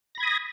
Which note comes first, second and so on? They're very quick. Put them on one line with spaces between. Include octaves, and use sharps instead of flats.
A#6 B5 G#6 D#6